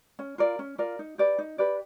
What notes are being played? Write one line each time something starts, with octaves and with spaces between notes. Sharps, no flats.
C#4
F4 A#4 D5
C#4
F4 A#4 D5
D#4
G4 B4 D5
D#4
G4 B4 D5